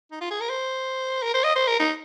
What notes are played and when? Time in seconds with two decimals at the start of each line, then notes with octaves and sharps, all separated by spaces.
0.12 D#4
0.21 F4
0.31 G#4
0.41 A#4
0.49 C5
1.22 A#4
1.34 C5
1.44 D#5
1.56 C5
1.68 A#4
1.80 D#4